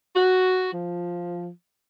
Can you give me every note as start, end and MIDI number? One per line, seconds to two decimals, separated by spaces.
0.15 0.69 66
0.72 1.48 53